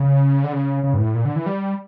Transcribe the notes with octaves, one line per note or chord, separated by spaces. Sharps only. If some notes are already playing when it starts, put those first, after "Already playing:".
Already playing: C#3
D3
C#3
C#3
G2
A2
A#2
D3
E3
G3